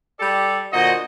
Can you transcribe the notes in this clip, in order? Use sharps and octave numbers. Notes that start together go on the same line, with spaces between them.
G3 G4 A4 D5
A#2 D3 F#4 C5 D#5